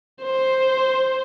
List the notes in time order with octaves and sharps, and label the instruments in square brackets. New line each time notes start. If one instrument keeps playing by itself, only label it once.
[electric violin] C5